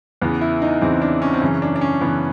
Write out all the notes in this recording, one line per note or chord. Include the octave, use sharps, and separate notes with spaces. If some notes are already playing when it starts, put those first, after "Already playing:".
E2 C#3 E3 B3
E4
D#4
E2 C#3 E3 C4
D4
C#4
C4
F#2 C#3 E3 C#4
D4
D4
C#4
F#2 C#3 E3 B3